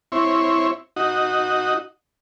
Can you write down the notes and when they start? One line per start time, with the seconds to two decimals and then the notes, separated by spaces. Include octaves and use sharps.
0.12 C4 E4 C#5
0.96 D#4 F#4